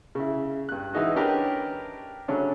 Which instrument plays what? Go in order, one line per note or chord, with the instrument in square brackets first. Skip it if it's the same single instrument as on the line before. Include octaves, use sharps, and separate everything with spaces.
[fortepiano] C#3 E4
G2 F#6
E3 G#3 D#4 F#4
C#4 D4 G4 A#4 B4
C#3 F#3 A3 C#4 D4